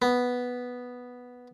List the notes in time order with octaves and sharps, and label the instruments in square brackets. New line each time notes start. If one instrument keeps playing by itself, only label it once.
[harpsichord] B3